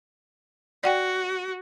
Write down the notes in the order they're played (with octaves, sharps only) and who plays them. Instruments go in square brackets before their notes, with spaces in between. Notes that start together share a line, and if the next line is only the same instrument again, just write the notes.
[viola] F#4 [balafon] D5 F#5 G5